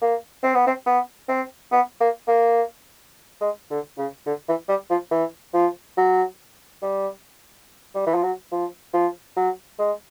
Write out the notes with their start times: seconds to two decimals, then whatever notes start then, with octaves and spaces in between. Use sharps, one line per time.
0.02 A#3
0.43 C4
0.55 B3
0.67 C4
0.86 B3
1.29 C4
1.72 B3
2.00 A#3
2.28 A#3
3.41 G#3
3.70 D3
3.98 C#3
4.26 D3
4.48 E3
4.69 G3
4.90 F3
5.11 E3
5.54 F3
5.97 F#3
6.82 G3
7.94 G3
8.07 E3
8.14 F3
8.23 F#3
8.52 F3
8.94 F3
9.36 F#3
9.79 G#3